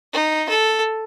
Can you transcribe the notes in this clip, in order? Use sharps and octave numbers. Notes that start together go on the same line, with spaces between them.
D#4
A4